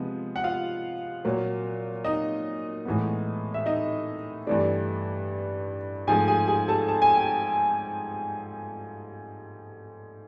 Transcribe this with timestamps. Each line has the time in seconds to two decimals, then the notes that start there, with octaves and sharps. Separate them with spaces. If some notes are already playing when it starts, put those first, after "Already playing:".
Already playing: C3 F3 G#3 B3
0.36 F#5
0.44 F4 F5
1.25 A#2 F#3 A#3
2.04 D#4 D#5
2.85 A2 E3 G#3 B3
3.54 E5
3.66 D#4 D#5
4.47 G2 E3 A3 D4 D5
6.07 G#2 F3 A3 G#4 G#5
6.28 G#4 G#5
6.48 G#4 G#5
6.68 A4 A5
6.88 A5
7.02 G#5
7.15 G5